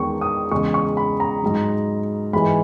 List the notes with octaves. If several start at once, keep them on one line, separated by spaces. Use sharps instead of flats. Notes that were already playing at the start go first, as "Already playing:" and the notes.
Already playing: E2 D#3 G#3 C#6
D#6
E2 C#3 G#3 C#6
C#6
B5
A#5
G#2 F#3
G#2 E3 G#3 B5